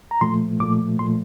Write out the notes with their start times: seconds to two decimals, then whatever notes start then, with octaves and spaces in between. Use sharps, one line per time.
0.11 A#5
0.21 A#2 F3 A3 C6
0.60 A#2 F3 A3 D6
0.99 A#2 F3 A3 C6